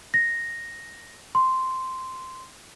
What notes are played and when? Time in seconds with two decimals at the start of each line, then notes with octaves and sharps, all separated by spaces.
0.14 A#6
1.35 C6